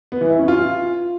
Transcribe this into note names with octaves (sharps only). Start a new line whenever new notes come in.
B3
E3
E4
C#4
F4